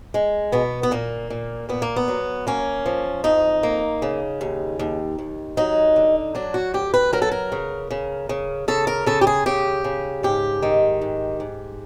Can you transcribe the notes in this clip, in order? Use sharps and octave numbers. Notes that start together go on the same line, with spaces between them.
G#3
B2 B3
B3
A#2 A#3
A#2
A#2 B3
A#3
B3
F#3
A#3 C#4
F3
F2 D#4
A#3
C#3
D#2
D#2
D#2
F#3 D#4
D3
F#3 D4
F#4
D2 G4
B4
F#3 A#4
A4
A#4
C#3
C#3
C#3
C#3 A4
A#4
C#3 A4
G4
G#4
C#3 G4
C#3
G#2 G4
D#3
G#2
G#2